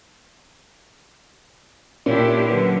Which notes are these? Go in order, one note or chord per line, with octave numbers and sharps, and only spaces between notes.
A#2 C#4 D4 E4 G4
D3 F#3 B4